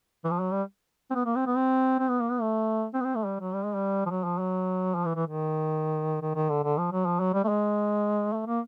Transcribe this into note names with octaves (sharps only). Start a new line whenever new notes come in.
E3
F3
F#3
G3
C4
B3
A#3
C4
B3
C4
C4
B3
A#3
B3
A3
C4
B3
C4
A3
G3
F#3
G3
G#3
G3
F3
F#3
F3
F#3
F3
E3
E3
D#3
D#3
D#3
D3
D3
F3
F#3
F3
F#3
G3
A3
G#3
A3
A#3